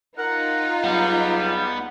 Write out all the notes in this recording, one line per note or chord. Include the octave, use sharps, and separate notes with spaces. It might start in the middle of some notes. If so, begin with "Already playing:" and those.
D#4 F4 A#4 F5 F#5
C#2 F#3 G3 B3